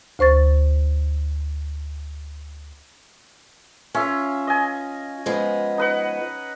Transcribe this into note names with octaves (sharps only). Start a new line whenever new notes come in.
D2 C5 C#6 A6
C#4 F4 E5
D#5 G#5
F3 G#3 B3
D#4 B4 F#5